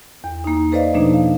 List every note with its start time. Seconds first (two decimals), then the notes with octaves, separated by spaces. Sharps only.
0.24 E2
0.44 A#3 D#4
0.72 A4 B4 C5 D5 D#5 F5
0.94 B2 F3 A3 A#3 D4 D#4
1.14 F5